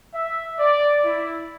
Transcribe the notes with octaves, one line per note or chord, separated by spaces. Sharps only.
E5
D5
E4